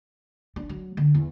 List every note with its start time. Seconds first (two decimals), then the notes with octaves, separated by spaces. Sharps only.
0.56 D4
0.69 F#3
0.97 D3
1.14 E2